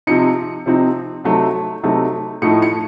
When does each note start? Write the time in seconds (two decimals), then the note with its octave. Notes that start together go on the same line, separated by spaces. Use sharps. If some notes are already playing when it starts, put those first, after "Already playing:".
0.07 C3 F3 C4 D#4 C#7
0.66 C3 F3 C4 D#4
1.24 C3 F#3 A3 D#4
1.83 C3 F#3 A3 D#4
2.42 A2 F3 A3 D#4 C#7
2.62 C#7